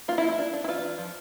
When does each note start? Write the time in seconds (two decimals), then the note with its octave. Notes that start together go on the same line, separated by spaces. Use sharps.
0.08 A#3 F4
0.18 E4
0.23 A#3
0.29 E4
0.38 D4
0.53 D4
0.64 E4
0.68 E3 F4
0.83 D4
0.98 F3